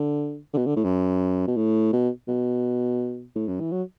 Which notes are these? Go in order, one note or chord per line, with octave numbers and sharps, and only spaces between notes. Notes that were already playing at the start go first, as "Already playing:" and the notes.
Already playing: D3
D3
B2
D3
A2
F#2
B2
A2
B2
B2
A2
F#2
E3
F#3